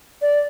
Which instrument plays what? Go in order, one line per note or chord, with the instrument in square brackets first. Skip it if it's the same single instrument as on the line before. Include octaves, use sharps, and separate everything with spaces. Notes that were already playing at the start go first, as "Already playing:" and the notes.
[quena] D5